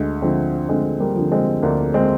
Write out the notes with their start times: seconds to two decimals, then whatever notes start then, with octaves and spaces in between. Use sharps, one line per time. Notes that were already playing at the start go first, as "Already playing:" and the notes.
Already playing: D2 G#3
0.22 D3 F3 G#3 C4
0.69 D2 G#3 C4
1.00 G3 A#3
1.15 D3 F3
1.32 G#3 C4
1.62 D2 A#3 D4
1.94 G#3 C4